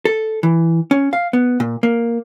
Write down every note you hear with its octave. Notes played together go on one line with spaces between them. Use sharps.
A4
E3
C#4
F5
B3
A#2
A#3